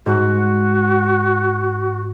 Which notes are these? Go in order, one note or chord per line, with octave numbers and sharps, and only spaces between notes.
G#2 F#4